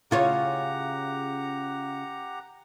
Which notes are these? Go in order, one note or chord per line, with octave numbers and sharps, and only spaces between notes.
C#3 F4 G4 C#5 F#5 A#5